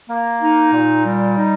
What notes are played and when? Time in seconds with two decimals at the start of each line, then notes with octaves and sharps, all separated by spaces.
0.09 A#3
0.41 D#4
0.73 A#2
1.05 G3
1.37 D#4